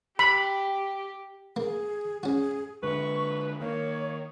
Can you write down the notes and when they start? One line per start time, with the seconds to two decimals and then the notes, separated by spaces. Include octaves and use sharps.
0.19 G4 B5
1.56 A#3 G#4
2.23 C#4 F#4 G#4
2.83 D3 G#3 B4 C#6
3.61 D#3 A#3 C#5